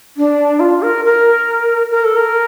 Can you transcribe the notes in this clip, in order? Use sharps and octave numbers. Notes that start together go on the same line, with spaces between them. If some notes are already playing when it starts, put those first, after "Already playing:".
D4
F4
A#4
A#4
A#4
A4
A#4